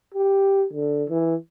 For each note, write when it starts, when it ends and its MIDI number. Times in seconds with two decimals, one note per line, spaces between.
0.14 0.66 67
0.73 1.04 50
1.10 1.35 52